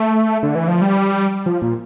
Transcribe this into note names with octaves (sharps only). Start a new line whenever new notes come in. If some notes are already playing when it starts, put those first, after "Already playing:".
Already playing: A3
D3
E3
F3
G3
F3
A#2